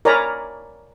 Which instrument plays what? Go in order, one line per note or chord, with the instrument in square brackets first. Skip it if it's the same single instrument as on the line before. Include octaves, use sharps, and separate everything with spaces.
[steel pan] A#4 C#5 D5 G#5 A#5 B5